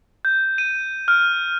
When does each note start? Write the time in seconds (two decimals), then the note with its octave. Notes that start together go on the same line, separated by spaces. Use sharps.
0.25 G6
0.58 D#7
1.08 F6